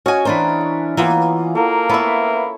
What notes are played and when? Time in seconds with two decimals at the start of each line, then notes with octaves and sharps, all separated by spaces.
0.06 C#4 F#4 D#5 F#5 G#5
0.25 E3 D4 A#4 C5 B5
0.61 C#6
0.97 E3 A#3 B3 F4
1.55 A#3 A4 A#4
1.89 B3 E4 E5 B5 C#6